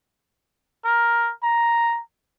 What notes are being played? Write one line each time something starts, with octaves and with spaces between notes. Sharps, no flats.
A#4
A#5